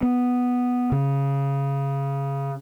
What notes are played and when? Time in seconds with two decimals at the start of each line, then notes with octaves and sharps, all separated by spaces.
0.03 B3
0.92 C#3